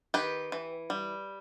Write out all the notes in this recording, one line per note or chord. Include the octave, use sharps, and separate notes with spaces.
D#3 G4 B4
E3
G3